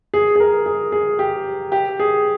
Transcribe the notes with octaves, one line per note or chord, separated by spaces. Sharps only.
G#4
G#4
A#4
G#4
G#4
G4
G4
G#4